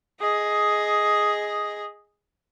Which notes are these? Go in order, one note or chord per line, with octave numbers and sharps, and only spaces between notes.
G#4 D#5